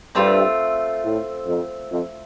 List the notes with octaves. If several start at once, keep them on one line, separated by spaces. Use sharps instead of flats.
G2 A3 C4 F4
A2
F2
F2